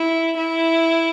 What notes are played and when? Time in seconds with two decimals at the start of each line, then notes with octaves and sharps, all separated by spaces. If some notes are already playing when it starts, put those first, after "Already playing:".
Already playing: E4
0.37 E4